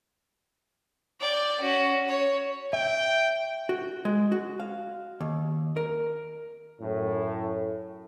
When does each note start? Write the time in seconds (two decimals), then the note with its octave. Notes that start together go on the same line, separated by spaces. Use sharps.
1.21 D5 G5
1.60 C#4 F#4
2.08 C#5
2.73 E5 G5
3.69 F#4
4.05 G#3
4.32 F#4
4.60 F5
5.21 D#2
5.77 A#4
6.81 F#2 A2